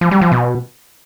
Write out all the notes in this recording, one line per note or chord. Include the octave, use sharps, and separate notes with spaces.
F3
G3
F3
B2